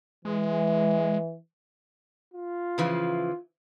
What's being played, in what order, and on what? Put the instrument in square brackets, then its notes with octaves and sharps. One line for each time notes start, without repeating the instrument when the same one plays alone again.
[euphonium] E3 [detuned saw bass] G#3
[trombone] F4
[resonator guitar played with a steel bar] C#3 E3 F3